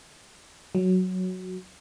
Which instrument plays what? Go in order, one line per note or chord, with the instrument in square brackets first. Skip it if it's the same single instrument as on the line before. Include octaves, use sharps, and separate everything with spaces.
[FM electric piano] F#3